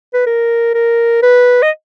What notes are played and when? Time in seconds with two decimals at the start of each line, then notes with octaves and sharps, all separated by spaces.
0.14 B4
0.26 A#4
0.74 A#4
1.23 B4
1.62 D#5